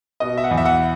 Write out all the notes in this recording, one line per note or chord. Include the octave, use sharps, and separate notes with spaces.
B2 D#5
E5
F#5
E2
E5
F#5